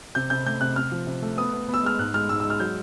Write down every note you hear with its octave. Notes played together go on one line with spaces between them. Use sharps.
C3 G6
C3 G6
A3 G6
C3 F#6
C3 F6
F3
C3
A3
B3 D#6
B3
B3
E6
G#3 F6
G#2 F#6
G#3 F6
G#2 E6
E6
G#3
F6
F#3 G6